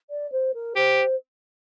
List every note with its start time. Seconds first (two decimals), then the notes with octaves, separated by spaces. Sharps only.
0.10 D5
0.32 C5
0.54 A#4
0.76 G4 C5